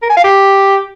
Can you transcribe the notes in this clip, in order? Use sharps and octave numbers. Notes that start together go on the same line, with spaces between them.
A#4
G#5
F5
G4